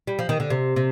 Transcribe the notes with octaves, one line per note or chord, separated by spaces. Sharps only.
G3
F3
D#3
D3
C3
C3